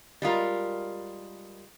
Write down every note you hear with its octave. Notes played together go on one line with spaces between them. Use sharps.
G3 G#3 F4 A#4